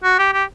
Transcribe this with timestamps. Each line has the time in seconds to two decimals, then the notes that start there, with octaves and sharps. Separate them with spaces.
0.04 F#4
0.19 G4
0.33 G4